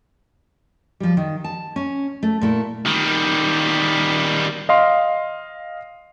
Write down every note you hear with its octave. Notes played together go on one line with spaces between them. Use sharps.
F3 G3
D#3
A5
C#4
A3
A#2 A3 E4
D#3 G3
D#5 F5 C6